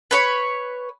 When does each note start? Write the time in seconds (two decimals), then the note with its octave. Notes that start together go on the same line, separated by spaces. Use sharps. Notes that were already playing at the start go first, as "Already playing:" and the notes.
0.11 B4 C#5 B5